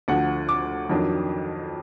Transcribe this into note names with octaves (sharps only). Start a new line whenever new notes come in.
D2 D3 F3 F#5
D6
F2 D#3 F#3 D4